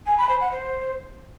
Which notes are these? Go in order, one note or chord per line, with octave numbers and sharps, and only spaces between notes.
G#5
B5
C5
F#5
C5